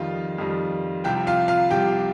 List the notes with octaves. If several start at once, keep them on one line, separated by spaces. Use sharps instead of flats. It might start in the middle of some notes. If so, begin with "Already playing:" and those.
Already playing: F2 D#3 G3 F4 F5
F2 D#3 G3
C2 C3 F3 G4 G5
F4 F5
F4 F5
C2 C3 F3 G4 G5